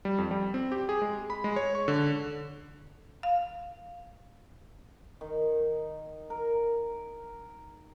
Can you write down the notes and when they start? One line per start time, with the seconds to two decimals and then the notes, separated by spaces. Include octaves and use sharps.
0.05 G3
0.18 F2
0.31 G3
0.54 C4
0.72 G4
0.89 G#4
1.02 G#3
1.30 B5
1.44 G#3
1.56 C#5
1.75 C#6
1.88 D3
3.23 F5
5.21 D#3
6.30 A#4